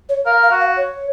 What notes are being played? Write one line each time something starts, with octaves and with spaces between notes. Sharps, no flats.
C#5
A#4 F5
F5
F#4
F5
C#5